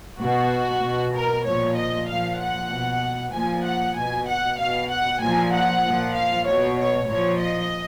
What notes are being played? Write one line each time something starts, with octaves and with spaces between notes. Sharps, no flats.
B2 F#4
B2
A#4
A#2 F3 C#5
D#5
A#2 F3 F5
F#5
B2
A#2 F3 G#5
F#5
B2 G#5
F#5
B2 F5
F#5
A#2 F3 G#5
F#5
A#2 F3
F5
B2 C#5
C#5
A#2 F3 C#5
D#5